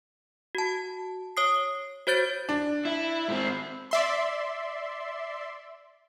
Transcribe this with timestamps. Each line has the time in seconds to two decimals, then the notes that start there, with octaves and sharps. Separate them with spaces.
0.55 F#4 A5
1.37 C#5 D#6 C7
2.07 F#4 C5 C#5 G6 A6 D7
2.49 D4
2.85 E4
3.28 G#2 C4
3.91 D5 E5 C6